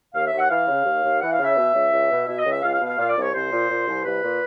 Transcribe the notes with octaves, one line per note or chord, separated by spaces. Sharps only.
D#2 F5
E5
D#2
F#5
E3 F5
C#3
D#2
D#2
E3 F#5
F5
C#3
E5
B2
C#2
C#2
B2
B2 E5
D#5
C#2
E5
C#2 F5
F5
B2
F5
A#2 F5
D5
C2
C#5
C2 C5
A#2
A#2
C2
C2 B4
A#2